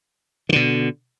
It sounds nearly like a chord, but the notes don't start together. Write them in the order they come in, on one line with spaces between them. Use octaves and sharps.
D#3 D3 B2